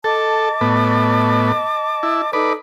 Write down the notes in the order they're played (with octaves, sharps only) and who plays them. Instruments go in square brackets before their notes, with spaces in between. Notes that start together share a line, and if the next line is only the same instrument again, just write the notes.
[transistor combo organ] A4 [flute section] D#5 A5 D6
[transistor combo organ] A2 B3
E4
[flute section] D#4 A4 D#6 [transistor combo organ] B4 D5